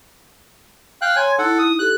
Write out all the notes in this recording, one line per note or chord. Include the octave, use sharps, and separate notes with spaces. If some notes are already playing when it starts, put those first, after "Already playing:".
F5 G5 F#6
C#5 G#5 A#5 C6
D#4 E4 A4 F#5
D#6
G4 A4 F#6